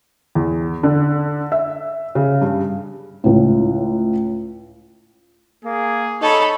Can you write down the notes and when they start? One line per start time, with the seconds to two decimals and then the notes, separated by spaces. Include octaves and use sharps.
0.35 E2
0.83 D3
1.52 E5
2.15 C#3
2.41 G2
3.24 C#2 A2
5.65 A#3 G#4
6.22 D#4 A4 C#5 B5